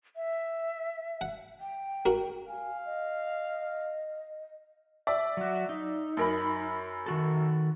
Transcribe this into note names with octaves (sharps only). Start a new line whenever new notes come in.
E5
F#5
G5
F#4 A#4
F5 G#5
D#5
D5 E5
F#3 F#4
D#4
F#2 A#4 B5
D#3 F#4 A4